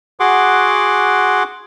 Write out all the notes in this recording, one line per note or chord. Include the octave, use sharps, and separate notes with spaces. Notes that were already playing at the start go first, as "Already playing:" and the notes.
F#4 G#4 F#5 C6 D6